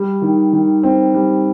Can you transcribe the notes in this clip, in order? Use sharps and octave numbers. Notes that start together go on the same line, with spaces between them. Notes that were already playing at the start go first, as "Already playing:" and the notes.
Already playing: G3
D#3
D#3
C4
G3